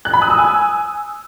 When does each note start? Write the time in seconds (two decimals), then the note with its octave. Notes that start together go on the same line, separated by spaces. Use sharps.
0.05 F#6
0.13 B5
0.22 D#6
0.30 E6
0.38 G#5